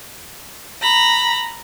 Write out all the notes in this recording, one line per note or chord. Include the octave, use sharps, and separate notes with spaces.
A#5 B5